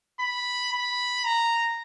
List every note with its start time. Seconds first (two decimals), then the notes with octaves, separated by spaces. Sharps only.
0.20 B5
0.72 B5
1.25 A#5